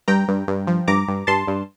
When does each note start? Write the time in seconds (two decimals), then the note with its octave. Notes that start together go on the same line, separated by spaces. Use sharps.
0.08 G2 G5 A#5
0.28 G2
0.48 G2
0.67 F3
0.88 G2 A#5 D6
1.08 G2
1.27 G2 A5 C6
1.48 G2